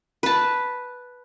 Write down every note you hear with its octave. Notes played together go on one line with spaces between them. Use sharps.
B4 A5